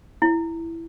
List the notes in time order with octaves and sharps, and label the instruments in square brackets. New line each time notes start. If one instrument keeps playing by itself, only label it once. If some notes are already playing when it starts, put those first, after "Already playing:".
[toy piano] E4